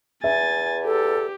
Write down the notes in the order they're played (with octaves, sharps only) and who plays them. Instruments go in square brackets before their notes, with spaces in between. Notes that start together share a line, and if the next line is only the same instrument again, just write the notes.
[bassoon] E2 [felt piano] E5 [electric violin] G#5 A6
[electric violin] G4 [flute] A4